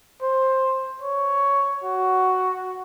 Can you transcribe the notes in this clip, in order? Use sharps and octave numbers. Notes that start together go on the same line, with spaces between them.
C5
C#5
F#4